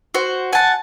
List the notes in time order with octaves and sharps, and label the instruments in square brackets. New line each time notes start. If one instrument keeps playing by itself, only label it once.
[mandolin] F#4 C5
[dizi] F#5 [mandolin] G#5 A5